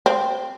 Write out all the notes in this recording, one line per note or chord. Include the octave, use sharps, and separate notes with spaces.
C4